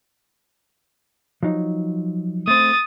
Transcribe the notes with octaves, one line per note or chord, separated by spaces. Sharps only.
F3 F#3 D#4
A3 C4 D#6 A6